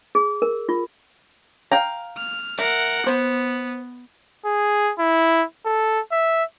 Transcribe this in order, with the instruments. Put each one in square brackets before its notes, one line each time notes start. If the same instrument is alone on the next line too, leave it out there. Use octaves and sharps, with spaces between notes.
[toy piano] G#4
A#4
F4
[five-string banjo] F5 G5 A#5
[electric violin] F6
[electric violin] A#4 F#5 [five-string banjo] E5
[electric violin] B3 [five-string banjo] C5
[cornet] G#4
E4
A4
E5